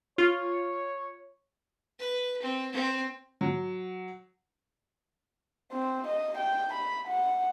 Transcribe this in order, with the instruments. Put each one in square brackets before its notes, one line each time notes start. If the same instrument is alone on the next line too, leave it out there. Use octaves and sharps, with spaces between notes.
[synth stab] F4 [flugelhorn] C#5
[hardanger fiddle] B4
C4
C4
[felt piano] F#3
[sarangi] C4
D#5
G5
B5
F#5